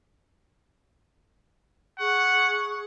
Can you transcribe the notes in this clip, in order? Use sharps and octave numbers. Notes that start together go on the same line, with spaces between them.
G#4 F#5 C#6